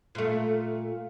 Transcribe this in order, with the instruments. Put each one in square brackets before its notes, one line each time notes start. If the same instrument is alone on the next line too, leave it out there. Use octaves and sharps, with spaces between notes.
[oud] A#2 A3